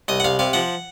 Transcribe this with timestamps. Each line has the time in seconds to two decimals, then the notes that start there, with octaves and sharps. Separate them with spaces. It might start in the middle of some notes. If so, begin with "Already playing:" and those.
0.08 C2 D#5
0.20 F#5
0.24 C2 F5
0.39 C3 F5
0.53 F3 F#5